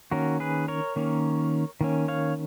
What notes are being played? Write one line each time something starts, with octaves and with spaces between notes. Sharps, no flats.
D#3 A#3 C#4 F#4 A#4
G#4 B4
A#4 C#5
D#3 A#3 C#4
D#3 A#3 C#4
C#5 F5